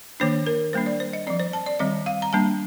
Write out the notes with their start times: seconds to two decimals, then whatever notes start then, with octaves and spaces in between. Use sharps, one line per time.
0.20 D#3 A#3 D4 C5
0.47 A#4
0.73 G3 A#3 D4 C5
0.86 D5
1.00 C5
1.13 D#5
1.27 F3 C4 D5
1.40 C5
1.53 A5
1.66 D5
1.79 D#3 G3 C4 D#5
2.06 F5
2.22 A#5
2.33 G3 A#3 D4 A5